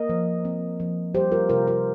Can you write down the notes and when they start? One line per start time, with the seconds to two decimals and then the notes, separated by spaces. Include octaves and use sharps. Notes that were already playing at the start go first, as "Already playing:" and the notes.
Already playing: A#3 A#4 D#5
0.09 F3
0.45 C4
0.80 F3
1.14 G3 G4 C5
1.32 F4 A#4
1.49 C3 F4 A#4
1.67 F4 A#4